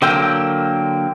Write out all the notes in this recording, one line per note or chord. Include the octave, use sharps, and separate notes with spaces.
D3 F#3 A#3 G5 E6